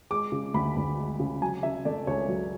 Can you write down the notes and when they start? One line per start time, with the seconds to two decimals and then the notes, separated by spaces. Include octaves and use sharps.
0.10 G#3 D6
0.32 C#3
0.54 D2 B5
0.76 D2
0.98 G#3
1.19 C#3
1.42 F#3 G#5
1.63 C#3 E5
1.85 A3 D5
2.07 C#2 C#5
2.29 F#3